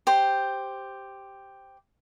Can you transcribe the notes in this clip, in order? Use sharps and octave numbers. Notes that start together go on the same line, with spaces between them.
G4 C5